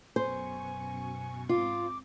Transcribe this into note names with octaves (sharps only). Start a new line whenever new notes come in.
F#2 B2 C5 G#5 C#6
G#2 C4 F4 D6